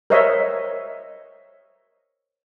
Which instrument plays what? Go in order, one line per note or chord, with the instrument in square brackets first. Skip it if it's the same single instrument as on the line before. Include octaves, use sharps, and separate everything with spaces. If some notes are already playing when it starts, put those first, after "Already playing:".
[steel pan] A#4 C5 C#5 D#5 E5